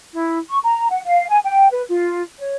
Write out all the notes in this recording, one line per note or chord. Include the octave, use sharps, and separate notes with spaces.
E4
C#6
A#5
F#5
F5
G#5
G5
B4
F4
C#5